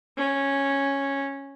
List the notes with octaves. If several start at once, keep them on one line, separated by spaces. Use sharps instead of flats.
C#4